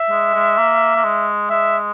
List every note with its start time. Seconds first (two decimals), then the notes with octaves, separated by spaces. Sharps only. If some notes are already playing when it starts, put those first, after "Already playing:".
Already playing: E5
0.10 G#3
0.34 G#3
0.58 A#3
0.96 A#3
1.04 G#3
1.50 G#3 E5